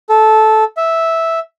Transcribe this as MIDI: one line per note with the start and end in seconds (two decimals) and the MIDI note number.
0.09 0.64 69
0.77 1.40 76